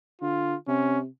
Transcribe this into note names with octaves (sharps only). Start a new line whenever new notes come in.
D3 F4
C3 C#4